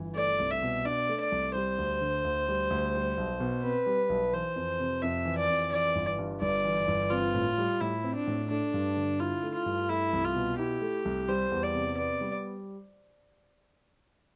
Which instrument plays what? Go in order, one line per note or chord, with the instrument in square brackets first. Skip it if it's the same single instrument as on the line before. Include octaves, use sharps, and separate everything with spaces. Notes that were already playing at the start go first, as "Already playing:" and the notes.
Already playing: [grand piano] G1 E3
[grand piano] A3 [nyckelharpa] D5
[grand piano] C2
[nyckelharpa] E5
[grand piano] B2
[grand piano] D4 [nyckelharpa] D5
[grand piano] A3
[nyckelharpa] D5
[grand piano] C2
[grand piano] G3 [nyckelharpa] C5
[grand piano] D2
D3
D2
G3
D2
G3
B1
B2
[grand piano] C4 [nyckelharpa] B4
[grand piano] G3
B1
[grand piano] E3 [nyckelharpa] C5
[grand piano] F2
C3
[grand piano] F2 [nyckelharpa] E5
[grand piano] E3
[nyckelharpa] D5
[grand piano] F2
[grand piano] E3 [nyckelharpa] D5
[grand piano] G1
G2
[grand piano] G1 [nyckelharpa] D5
[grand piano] E3
G1
[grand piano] C4 [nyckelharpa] F4
[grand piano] A2
G3
[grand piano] A2 [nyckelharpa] E4
[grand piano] C4
[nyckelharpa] D4
[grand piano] A2
[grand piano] A3 [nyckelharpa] D4
[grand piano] G2
D3
[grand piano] E4 [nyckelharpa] F4
[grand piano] A3
[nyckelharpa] F4
[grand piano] G2
[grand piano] A3 [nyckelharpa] E4
[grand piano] C2
[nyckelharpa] F4
[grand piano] B2
[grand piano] E4 [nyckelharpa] G4
[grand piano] A3
C2
[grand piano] G3 [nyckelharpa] C5
[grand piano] E2
[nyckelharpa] D5
[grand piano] C3
[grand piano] B3 [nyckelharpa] D5
[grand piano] G3